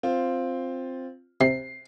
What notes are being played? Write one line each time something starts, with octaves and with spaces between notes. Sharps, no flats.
C4 F4
C3 C7